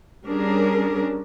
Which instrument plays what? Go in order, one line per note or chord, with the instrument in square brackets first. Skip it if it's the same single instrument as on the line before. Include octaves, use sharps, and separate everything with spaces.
[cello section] G3 C#4 D4 G#4 A#4